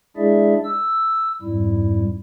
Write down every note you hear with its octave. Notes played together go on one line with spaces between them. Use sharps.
G#3 D4 E4 G#4 D5 E5
E6
F2 G#2 G3 E4